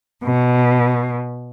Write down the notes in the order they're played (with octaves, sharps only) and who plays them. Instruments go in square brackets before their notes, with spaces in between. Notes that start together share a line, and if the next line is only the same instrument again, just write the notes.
[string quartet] B2